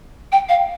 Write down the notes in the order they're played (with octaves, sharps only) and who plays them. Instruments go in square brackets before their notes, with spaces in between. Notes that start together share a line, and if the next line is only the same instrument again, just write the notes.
[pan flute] G5
F5